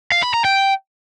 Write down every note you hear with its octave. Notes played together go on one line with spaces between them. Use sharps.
F5
B5
A#5
G5